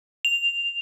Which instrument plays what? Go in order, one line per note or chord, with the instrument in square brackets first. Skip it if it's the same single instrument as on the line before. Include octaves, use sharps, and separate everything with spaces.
[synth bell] F7